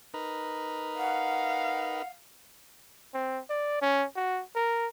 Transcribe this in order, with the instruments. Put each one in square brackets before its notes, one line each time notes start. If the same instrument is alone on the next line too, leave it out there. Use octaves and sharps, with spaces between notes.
[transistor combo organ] D#4 A#4 B4
[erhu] F5 [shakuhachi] F#5
[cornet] C4
D5
C#4
F#4
A#4